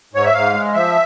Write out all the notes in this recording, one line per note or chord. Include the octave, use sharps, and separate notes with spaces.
G#2 C#5
E5
G#2 F5
G#3
F3 E5